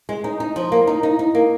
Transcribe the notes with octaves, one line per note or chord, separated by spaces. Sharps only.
G#3
D#4
D#4
F3
A#3
D#4
D#4
D#4
A#3